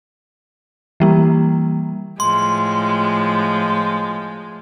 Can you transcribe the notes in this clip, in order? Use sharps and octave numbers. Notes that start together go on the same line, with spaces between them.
E3 G3 A#3
A2 F3 G#3 C6